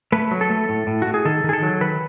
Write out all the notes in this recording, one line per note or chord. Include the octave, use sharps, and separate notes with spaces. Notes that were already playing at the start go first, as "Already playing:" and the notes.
A3 B4
F#3
A4
A3
A2
A2
A2 F#4
G#4
D#3 A4
D#3
G#4
A4
F#3
D#3 B4